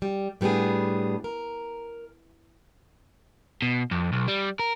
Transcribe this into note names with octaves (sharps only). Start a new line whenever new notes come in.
G3
A2 G3 B3 D4 G#4
A#4
B2
F2
B1
G3
A#4